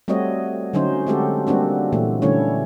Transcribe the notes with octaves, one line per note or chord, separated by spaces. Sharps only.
G3 A3 C4 F#4 C#5 D#5
D3 F#3 C#4 D#4 C5
G#3 A3 C4 F#4 G4 A4
G3 A#3 C4 D4 F#4
A#2 E3 A3
D3 G3 A3 C#4 E4 C#5